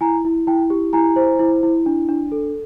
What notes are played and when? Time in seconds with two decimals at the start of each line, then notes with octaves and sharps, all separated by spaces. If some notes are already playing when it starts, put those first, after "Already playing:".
0.01 E4 G#5 A#5
0.25 E4
0.47 E4 G5 A5
0.70 G4
0.93 E4 G#5 A#5
1.16 C5
1.39 E4
1.63 E4
1.86 D4
2.09 D4
2.32 A4